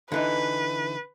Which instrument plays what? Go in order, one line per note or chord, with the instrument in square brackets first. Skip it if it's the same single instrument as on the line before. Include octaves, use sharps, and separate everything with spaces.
[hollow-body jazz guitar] D3 E3 D#4 [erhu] B4